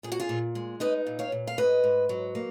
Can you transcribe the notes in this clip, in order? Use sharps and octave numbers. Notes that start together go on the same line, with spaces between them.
A#2 G#4
F#4
F4 G#4
A#2
G#3
D#4 B4 D#5
A#2
C#5 F5
A#2
F5
G#2 B4 D#5
G#2
F#3
A#3